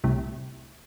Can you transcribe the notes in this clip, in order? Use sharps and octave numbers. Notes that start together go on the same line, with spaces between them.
C2 A2 C3